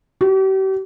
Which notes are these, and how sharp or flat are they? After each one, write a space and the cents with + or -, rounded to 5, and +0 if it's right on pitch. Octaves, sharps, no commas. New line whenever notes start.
G4 -40